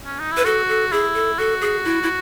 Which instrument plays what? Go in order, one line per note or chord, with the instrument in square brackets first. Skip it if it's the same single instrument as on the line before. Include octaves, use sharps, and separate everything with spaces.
[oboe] C#4
D#4
[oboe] E4 [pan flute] B4
[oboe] F#4 [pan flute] A4
[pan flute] A4
[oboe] E4 [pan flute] G#4
[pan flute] A4
[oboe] F#4 [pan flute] A4
[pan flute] G#4
E4
E4